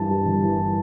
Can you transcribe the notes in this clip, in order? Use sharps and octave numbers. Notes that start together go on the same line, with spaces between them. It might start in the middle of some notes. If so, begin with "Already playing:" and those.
Already playing: G2 E3 A5
G3
G1
E3